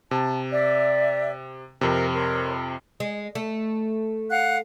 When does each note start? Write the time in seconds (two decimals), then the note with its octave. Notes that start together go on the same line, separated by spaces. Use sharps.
0.11 C3 A5
0.52 D5 E5
1.81 F2 C3 A#4
2.14 A#4 C#5 C6
3.00 G#3
3.35 A3
4.31 F5 F#5 F#6